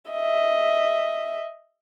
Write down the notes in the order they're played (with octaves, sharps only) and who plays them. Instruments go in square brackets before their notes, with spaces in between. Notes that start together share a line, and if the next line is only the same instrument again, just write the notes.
[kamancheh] D#5 E5